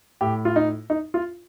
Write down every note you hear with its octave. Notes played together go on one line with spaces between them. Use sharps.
A2 G4
F4
D#4
D#4
F4